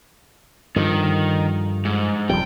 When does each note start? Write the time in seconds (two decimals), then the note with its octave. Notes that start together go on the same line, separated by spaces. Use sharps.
0.76 G2 D3 D#3 F3
1.85 G#2
2.29 F1 F2 G3 G5